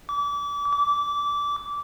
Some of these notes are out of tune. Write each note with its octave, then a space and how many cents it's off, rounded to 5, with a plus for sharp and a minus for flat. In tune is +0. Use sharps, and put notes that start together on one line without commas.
D6 -35
D6 -20